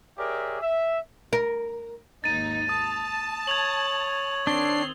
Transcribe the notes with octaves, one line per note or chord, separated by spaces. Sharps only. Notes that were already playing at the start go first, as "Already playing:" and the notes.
G4 G#4 A#4 C#5 D5 E5
E5
A#4
G#1 D#2 D#4 A6 D#7
A5 D#6
C#5 G#6 F7 F#7
D#3 C4 D4 C7 G7